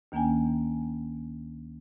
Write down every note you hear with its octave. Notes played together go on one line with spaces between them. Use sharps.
D2 D#3 A#3 C#4 G5 G#5